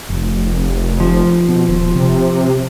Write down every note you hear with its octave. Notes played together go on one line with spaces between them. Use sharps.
F1
F3
B2
D#1
C3